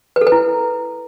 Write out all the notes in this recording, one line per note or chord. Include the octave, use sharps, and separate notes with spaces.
B4
A4
B4
E4